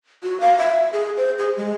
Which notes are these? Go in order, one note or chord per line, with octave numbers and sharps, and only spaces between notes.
F#4
F5
E5
G#4
C5
G#4
G#3